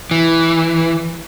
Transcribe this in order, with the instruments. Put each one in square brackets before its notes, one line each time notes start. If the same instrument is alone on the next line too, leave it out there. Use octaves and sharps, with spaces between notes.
[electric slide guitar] E3